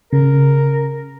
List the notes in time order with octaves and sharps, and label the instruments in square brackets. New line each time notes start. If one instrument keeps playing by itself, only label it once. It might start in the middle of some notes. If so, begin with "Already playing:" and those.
[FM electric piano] C#3 [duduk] A#4